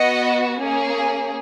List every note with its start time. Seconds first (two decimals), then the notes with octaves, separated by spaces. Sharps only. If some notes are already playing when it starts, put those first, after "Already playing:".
Already playing: B3 F#4 D#5 F#5
0.59 A#3 C#4 G#4